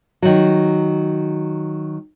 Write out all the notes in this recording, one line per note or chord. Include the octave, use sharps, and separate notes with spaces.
D#3 F#3